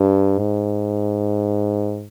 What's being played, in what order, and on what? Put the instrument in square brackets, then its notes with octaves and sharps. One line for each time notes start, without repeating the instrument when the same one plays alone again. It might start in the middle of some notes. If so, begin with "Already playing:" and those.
Already playing: [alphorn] G2
G#2